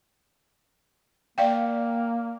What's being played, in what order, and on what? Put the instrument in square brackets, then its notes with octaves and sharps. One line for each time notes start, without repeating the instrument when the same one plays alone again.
[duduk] A#3 [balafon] D5 F5 G5